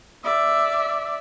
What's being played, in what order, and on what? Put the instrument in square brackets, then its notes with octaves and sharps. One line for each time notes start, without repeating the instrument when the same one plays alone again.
[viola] D5 E5